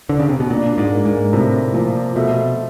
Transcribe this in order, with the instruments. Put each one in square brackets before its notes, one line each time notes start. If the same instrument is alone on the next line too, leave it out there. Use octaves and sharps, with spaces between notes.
[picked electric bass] D3
C#3
C3
B2
[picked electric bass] A#2 [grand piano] D4
[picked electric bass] G#2
[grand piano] A#3
[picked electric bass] G#2
[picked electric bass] A2 [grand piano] C3
[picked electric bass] A#2 [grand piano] F3
[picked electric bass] B2 [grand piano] A3